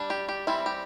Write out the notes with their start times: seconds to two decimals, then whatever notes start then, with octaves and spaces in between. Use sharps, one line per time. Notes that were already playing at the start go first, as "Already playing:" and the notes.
Already playing: G3 D4
0.10 G4
0.29 G4
0.47 E3 G3 C4 E4
0.66 G4